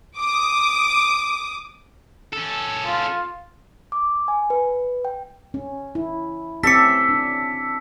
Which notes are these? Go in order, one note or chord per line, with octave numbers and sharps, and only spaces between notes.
D6 D#6
C#4 A4
F4
D6
G#5
B4
G5
C#4
E4
C4 C#4 G4 A4 E5 D6 B6 C#7
D4